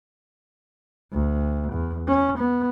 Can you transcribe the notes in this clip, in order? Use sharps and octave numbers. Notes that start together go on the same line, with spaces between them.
D2
E2
C#4
B3